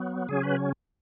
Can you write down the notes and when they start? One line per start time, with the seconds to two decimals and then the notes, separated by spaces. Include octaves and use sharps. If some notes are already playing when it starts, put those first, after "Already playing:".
Already playing: F#3 B3
0.28 C#3 F#3 C#4 G#4
0.43 B4